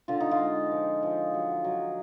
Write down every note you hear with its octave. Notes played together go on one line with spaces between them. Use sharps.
D3 F4
D#4
F4
G#3
F3
F3
F#3
F#3